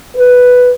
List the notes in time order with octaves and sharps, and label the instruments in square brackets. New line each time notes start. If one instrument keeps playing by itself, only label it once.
[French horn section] B4